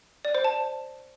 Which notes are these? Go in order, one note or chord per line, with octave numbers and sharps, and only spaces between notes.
D5
C5
A5